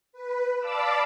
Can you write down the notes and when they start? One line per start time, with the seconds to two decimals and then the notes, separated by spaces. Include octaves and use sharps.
0.13 B4
0.59 D5 F5 A5 B5 D6 E6